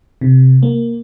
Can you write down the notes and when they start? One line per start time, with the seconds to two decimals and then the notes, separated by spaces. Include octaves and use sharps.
0.21 C3
0.63 A#3